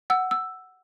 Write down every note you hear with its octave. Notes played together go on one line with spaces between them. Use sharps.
F#5 E6
E6